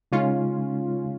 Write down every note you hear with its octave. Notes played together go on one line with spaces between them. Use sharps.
C#3 G#3 C#4 D#4 F4